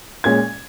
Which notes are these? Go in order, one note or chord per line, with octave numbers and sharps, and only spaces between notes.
A#2 G#3 C#4 G#6